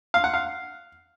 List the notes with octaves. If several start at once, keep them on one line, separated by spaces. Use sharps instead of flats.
F5
F#5
F5